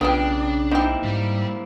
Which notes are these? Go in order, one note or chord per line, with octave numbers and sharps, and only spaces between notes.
B1 C#3 B3 D4 F4 G4 G5
A#3 C4 D#4 E4 G4
G#2 G3